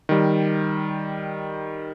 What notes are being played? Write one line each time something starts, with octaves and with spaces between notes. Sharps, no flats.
D#3 G3